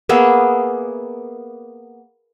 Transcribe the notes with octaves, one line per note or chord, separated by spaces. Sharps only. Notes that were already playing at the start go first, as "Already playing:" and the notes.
A#3 B3 G#4 E5